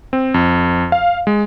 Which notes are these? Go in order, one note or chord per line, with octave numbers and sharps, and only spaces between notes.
C4
F2
F5
G#3